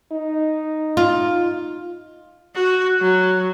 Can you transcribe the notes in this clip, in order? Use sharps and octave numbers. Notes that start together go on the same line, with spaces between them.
D#4
F4
F#4
F#3